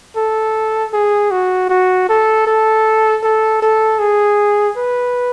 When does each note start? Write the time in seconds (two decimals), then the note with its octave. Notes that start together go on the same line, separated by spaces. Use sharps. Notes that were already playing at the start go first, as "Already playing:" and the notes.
0.17 A4
0.93 G#4
1.31 F#4
1.69 F#4
2.09 A4
2.47 A4
3.23 A4
3.62 A4
3.99 G#4
4.77 B4